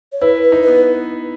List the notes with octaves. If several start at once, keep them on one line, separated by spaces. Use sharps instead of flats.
C#5
E4 B4
B4
D#4
B4
B3